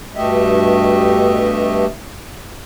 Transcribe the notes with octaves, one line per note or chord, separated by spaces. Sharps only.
G2 B2 A3 G4 D#5 E5